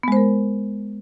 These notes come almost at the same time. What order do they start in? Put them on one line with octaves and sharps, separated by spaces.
B3 G#3 C5 A#4